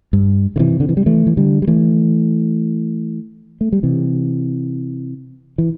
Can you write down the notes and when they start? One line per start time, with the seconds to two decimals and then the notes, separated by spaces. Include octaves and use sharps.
0.13 G2
0.56 D3
0.59 C3 E3
0.80 D3
0.89 E3
0.97 G3
1.06 E3 A3
1.27 E3
1.37 D3 G3
1.62 G3
1.67 E3 A3
3.61 A3
3.72 G3
3.83 C3 E3
5.58 E3